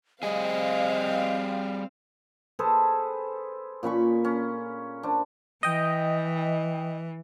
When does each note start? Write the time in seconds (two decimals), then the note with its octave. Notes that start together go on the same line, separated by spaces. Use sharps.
0.23 G3 C4 G#4 D#5 F5
2.59 G#4 A4 B4 C5
3.83 A#2 C#4 B5 C#6
4.25 C#4
5.03 D4 C5
5.63 E3 D#5 G5